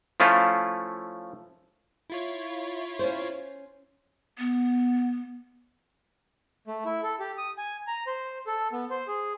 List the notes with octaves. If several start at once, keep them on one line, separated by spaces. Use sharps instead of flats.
F3 A3 C#4 E4 F4
E4 F4 C#5
C#4 C5
B3
A3
E4
A4
G4
D#6
G#5
A#5
C5
A4
B3
C5
G#4